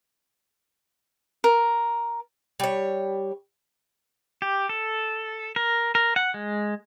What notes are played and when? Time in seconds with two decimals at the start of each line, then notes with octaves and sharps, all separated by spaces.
1.44 A#4
2.60 G3 C#5
4.42 G4
4.69 A4
5.56 A#4
5.95 A#4
6.16 F#5
6.34 G#3